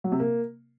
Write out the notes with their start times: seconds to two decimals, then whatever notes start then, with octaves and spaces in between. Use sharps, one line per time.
0.04 F#3
0.12 C3
0.19 A#3